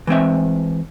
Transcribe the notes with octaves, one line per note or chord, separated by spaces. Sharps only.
E3 G#3 C4 E5